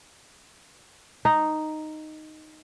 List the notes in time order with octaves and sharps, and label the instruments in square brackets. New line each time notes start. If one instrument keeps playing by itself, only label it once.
[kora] D#4